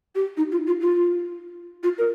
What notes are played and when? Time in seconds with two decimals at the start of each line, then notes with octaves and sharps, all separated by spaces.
0.15 G4
0.37 D#4
0.52 F4
0.67 F4
0.81 F4
1.83 F4
1.98 A#4